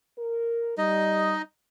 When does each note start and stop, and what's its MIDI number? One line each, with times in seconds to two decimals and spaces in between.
0.18 0.76 70
0.78 1.38 55
0.78 1.42 63
0.78 1.42 75